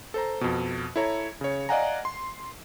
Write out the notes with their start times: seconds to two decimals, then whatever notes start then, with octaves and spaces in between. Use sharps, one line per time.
0.14 A4 C5 A#5
0.41 F2 B2
0.96 E4 A4 C#5 A#5
1.41 C#3 C#5
1.69 D5 D#5 F5 F#5 G#5 A#5
2.05 C6